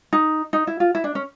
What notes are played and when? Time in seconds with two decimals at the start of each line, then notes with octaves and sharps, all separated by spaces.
0.13 D#4
0.53 D#4
0.67 E4
0.80 F4
0.95 E4
1.04 D4
1.15 C#4